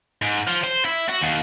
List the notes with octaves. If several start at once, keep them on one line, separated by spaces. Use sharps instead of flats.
G#2
F3
C5
E4
F#4
D#2